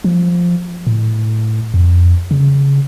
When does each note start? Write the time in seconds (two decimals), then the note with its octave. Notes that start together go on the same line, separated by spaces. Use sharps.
0.04 F3
0.87 A2
1.74 F2
2.31 C#3